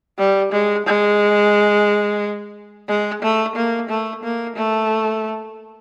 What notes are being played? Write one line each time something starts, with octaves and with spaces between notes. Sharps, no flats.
G3
G#3
G#3
G#3
A3
A#3
A3
A#3
A3